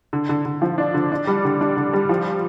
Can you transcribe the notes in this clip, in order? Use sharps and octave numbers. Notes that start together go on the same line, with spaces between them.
D3
D3
D3
F3
D4
D3
D4
G3
D3
D4
D3
G3
F3